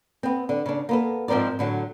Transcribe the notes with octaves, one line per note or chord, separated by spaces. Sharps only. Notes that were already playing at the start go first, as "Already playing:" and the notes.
B3 C4
D3
C#3 D4
A#3 B3 A4
G#2 F3 C4 A#4 D5
A2 D3 F#3